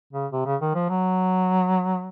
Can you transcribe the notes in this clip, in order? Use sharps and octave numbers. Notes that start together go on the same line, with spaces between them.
C#3
C3
C#3
D#3
F3
F#3